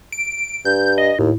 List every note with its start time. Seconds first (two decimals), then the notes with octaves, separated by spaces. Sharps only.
0.12 D7
0.65 G2 G6
0.98 D#5
1.19 D#2 A2